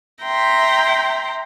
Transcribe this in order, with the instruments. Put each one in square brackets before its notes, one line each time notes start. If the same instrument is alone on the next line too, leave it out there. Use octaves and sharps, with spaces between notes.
[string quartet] E5 G5 A#5 C6